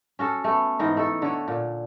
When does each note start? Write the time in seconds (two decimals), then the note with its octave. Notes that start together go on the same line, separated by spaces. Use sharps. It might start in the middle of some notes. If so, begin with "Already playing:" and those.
0.19 C#4 F#4 A4
0.44 A3 B3
0.79 G#2 E3 D#4
0.97 A3 A4
1.22 D3 C#5
1.48 A#2